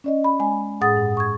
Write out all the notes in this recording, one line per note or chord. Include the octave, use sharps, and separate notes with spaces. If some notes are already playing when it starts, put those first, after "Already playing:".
C#4 D5 D#5
B5
G#3 G#5
A2 G#4 F#5 D#6 A6
G2
C#6 G#6